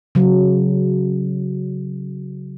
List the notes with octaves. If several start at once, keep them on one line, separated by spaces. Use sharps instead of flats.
C#3 F#3